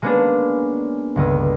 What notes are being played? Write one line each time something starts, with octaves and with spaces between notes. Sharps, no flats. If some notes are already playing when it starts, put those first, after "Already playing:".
G#3 A#3 B3 C#4 D4 G#4
G1 C#2 D#6